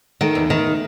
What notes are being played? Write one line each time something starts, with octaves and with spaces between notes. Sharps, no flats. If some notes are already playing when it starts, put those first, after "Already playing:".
D#3 A3
E2
D#3